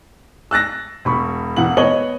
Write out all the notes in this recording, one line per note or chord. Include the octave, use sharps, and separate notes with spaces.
E6 F#6 A6 A#6
E1 B5 C#6
E1 E3 F#5 F#7
B3 C#5 D#5 C#6 F#7 G7